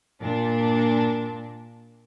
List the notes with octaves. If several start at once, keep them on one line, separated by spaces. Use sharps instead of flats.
A#2 D4